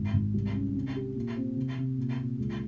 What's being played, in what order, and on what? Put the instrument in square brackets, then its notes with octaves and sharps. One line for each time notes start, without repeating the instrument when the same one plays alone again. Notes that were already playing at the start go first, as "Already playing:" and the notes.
Already playing: [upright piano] G#1
G#1
C2
C#4
C3
G4
A#2
C4
C3
C3
A#2
A#2
C#2